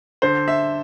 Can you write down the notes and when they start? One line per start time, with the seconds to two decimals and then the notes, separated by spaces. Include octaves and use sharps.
0.22 D3 C5
0.48 E5